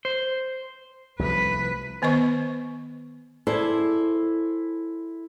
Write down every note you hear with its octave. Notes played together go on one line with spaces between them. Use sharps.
C5
C2 F3 A3 B4
D#3 B3 B4 D#5 C#6
E4 G#4 A4 C5 D5